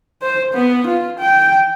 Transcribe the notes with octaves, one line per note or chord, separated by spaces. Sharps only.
C5
B3
F4
G5